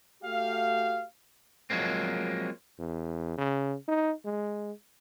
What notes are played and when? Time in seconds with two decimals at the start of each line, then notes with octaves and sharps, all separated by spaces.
0.23 A3 F#4 G4 F5
1.70 F3 F#3 G#3 A#3 C4
2.79 E2
3.38 C#3
3.88 D#4
4.25 G#3